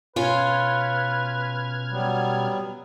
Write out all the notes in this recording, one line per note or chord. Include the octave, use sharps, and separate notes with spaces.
B2 C#4 F4 B4 F6 G#6
F#3 G3 B3